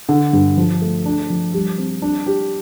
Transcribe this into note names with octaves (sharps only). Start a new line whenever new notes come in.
D3
G2
F3
A3
D4
F3
G3
C4
D4
G4